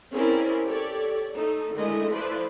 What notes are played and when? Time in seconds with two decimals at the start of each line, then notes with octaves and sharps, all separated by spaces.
0.12 C4 C#4 E4 G#4 A#4 D5
0.64 G4 A4 C#5 D5
1.34 A3 D#4 A4
1.74 D3 D#3 G#3 A3 E4 D#5
2.09 F3 A3 E4 B4 C5 D5